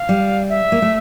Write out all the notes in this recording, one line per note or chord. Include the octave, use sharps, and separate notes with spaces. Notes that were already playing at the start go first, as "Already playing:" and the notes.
Already playing: F5
G3
E5
A#3
A3